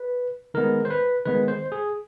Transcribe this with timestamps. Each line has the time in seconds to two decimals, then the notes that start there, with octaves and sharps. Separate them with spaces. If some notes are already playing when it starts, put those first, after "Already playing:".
Already playing: B4
0.54 D#3 G#3 B3 A#4
0.85 C5
0.90 B4
1.25 D#3 G#3 B3 B4
1.48 C5
1.72 G#4